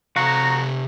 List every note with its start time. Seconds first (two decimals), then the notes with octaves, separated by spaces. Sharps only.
0.16 C3 F#4 F5 A#5